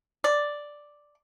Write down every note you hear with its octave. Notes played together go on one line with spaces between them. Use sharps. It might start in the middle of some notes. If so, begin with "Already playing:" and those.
D5